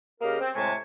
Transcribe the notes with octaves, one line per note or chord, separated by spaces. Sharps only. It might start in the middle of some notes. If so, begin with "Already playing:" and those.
C#3 A#3 G4 A#4 D#5 F5
C4
A2 C3 G#3 G#5 A5 C#6